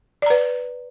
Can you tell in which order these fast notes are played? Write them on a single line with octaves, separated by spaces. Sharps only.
D5 A#5 B4